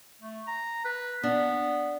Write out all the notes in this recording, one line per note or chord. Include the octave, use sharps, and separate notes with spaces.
A3
A#5
B4
B3 D4